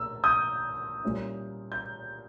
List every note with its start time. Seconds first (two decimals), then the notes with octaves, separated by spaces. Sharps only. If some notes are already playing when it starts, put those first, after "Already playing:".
Already playing: A#2 A#3 E6
0.24 D#6 G6
1.03 A#2 G3 C#4 E4
1.72 G6